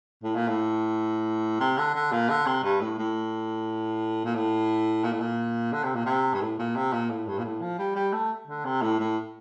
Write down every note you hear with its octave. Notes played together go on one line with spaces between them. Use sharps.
A2
A#2
A2
C3
D3
D3
A#2
D3
C3
G2
A2
A2
A#2
A2
A#2
A2
A#2
D3
C3
A#2
C3
G2
A2
A#2
C3
A#2
A2
G2
A#2
A2
F3
G3
G3
A3
D3
C3
A2
A2